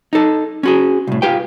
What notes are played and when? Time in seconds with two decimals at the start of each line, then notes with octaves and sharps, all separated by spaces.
0.13 D#4 A4
0.63 C#4 F#4 G#4
1.07 C2 A2
1.22 F4 G4 B4 G5